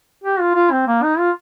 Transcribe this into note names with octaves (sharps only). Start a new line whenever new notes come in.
G4
F4
F4
C4
A#3
D#4
F4